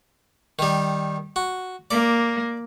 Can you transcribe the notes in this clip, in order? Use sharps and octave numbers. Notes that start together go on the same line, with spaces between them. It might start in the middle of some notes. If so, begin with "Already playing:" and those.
D#3 G3
F#4
A#3 D5